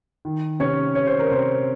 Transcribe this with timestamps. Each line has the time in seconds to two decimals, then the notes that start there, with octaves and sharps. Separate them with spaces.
0.25 D#3
0.60 C3 C#4 C#5
0.95 C3 C#5
1.07 C5
1.19 A#4
1.31 C3 C4 C5